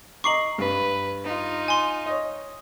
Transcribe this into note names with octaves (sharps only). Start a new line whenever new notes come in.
D#5 A#5 C#6 D6 C7 F#7
G2 B4
D#4 F4
G#5 C6
C#5 D#5